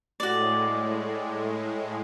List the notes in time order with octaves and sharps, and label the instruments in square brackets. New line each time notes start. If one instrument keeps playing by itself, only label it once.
[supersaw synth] A2 G#3 [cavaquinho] F#4 D5